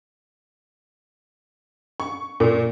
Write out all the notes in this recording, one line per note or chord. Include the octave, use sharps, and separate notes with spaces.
C#6
A#2